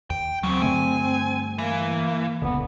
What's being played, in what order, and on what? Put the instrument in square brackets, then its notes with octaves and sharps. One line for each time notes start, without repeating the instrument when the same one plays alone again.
[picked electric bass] D#2 [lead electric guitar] G5
[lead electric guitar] E2 C#3 [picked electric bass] F#3 [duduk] C4
[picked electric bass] G2 D3 A3 [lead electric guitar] G#5
[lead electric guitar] E3 [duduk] A#3
[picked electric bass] D#1 C#2 D3 [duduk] B3